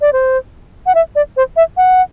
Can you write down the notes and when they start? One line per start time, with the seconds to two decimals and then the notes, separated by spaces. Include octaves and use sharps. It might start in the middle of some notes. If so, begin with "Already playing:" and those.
0.01 D5
0.13 C5
0.86 F#5
0.95 E5
1.15 D5
1.37 C5
1.56 E5
1.77 F#5